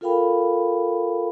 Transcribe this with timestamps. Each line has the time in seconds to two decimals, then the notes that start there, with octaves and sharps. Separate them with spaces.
0.01 F4 A4 A#4 F5 G5 B5